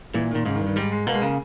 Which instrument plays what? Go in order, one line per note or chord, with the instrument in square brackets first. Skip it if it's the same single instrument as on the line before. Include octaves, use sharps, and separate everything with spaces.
[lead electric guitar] A#2 [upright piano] E3
[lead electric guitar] A#2 [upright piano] D#3
[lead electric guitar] G#2 [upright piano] C#3
[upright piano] D#3
[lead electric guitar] G2
[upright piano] D#3
[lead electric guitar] G#2 [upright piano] G3
[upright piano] G#3
[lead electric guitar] B2 [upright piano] A#3
[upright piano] G#3
[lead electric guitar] C#3 [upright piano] A#3